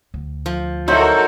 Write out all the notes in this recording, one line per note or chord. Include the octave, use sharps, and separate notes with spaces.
D2
F3
F#3 D#4 E4 F#4 A4 A#4 C5